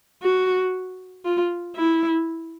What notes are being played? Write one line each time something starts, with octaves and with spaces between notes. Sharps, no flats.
F#4
F4
E4